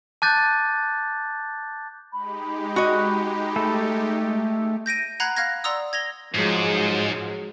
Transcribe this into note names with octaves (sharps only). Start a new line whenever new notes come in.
A5 D6 F#6 G6 A6
G#3 D#4 G4 B5
F#4 D#5
A3 A4
G6 A#6 D7 D#7
F#5 A#5 B5 F#6 G#6 C7
F5 F6 F#6 G#6 A#6
D5 F#5 A#5 C6 D#6 E6
G#6 A#6 F7 G7
G#2 F3 F#3 G#3